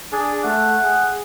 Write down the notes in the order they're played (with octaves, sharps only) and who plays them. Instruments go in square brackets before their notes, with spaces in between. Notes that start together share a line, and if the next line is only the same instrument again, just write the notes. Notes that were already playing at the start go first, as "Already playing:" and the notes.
[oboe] D4 [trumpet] G#4
[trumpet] A3 [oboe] F#5
[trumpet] G#4